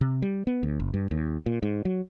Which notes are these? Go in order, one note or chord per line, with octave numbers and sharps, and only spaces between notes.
C3
G3
B3
D2
F#1
G2
D#2
A#2
G#2
F#3